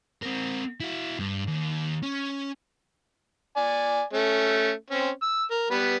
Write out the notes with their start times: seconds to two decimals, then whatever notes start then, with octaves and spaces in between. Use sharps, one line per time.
0.22 C4 A#4
0.80 E4 F#4
1.19 G2
1.47 D#2
2.02 C#4
3.56 D5 G#5
4.13 A3 C#4
4.90 C4 C#4
5.22 E6
5.50 A#4
5.71 G3 B3 B4